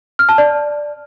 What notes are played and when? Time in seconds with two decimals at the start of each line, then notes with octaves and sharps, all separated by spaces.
0.19 F6
0.29 A5
0.38 D5